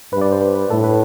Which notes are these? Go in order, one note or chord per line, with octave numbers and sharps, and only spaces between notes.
G2 B4
D5
C5
B4
B4
A2 A4
B4